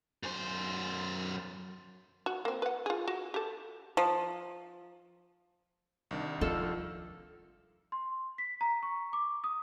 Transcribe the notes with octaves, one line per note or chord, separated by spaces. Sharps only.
F#2 C5
F#4
A#3 C4
B4 F#5
F4 G#4
F#4
G4 A4
F3
C2 D#3 D4
F3 F4 A4
C6
B6
A#5
C#6
D6
D#6